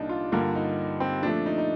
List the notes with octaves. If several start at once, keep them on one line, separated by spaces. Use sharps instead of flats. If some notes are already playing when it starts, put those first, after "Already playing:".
Already playing: C2 A#2 G3 A#3 D4 D#4
F4
G2 D3 G3 A#3 F4
D#4
C4
A#2 F3 A3 D4
D#4
D#4